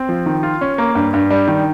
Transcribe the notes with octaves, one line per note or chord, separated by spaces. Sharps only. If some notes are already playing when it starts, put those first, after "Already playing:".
Already playing: C4
F3
D#3
F4
C#4
A#3
G2
G2
G3
D#3